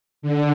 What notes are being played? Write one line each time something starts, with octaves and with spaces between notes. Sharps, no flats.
D3